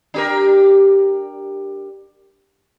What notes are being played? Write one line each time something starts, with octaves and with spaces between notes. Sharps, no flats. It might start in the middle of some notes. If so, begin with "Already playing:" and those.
D4 G4 A#4